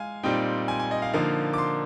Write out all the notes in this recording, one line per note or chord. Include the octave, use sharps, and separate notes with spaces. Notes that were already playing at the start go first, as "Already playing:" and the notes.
Already playing: G#3 F5 G#5
A#2 G3 C4 D#4 G5
G#5
G#5
D#5
F5
D3 F3 A#3 D#4 F5
D6
C6